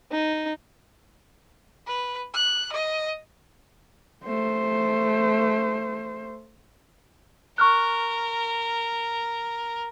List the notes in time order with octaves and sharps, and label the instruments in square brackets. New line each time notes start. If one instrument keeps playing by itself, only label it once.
[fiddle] D#4
[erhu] B4
F#6
D#5
[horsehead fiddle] A3 C5
[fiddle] A#4 [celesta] C#6 F6 F#6